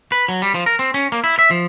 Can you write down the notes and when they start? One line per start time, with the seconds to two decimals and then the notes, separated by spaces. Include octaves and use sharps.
0.12 B4
0.28 F#3
0.42 G3
0.54 F3
0.66 A#4
0.79 C4
0.94 C#4
1.12 A#3
1.24 E4
1.39 E5
1.51 F3